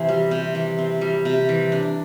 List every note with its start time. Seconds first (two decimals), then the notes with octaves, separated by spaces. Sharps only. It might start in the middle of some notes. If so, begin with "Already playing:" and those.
Already playing: C3 E3 C4 E4
0.08 G3
0.31 C3
0.55 E3
0.78 C4
1.01 G3
1.25 C3
1.49 E3
1.72 D4